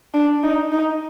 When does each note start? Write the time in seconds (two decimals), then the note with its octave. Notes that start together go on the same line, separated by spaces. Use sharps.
0.14 D4
0.43 D#4
0.72 D#4